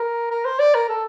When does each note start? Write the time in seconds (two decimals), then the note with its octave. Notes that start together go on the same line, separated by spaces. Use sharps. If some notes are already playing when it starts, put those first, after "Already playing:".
Already playing: A#4
0.31 A#4
0.45 C5
0.59 D5
0.75 A#4
0.89 A4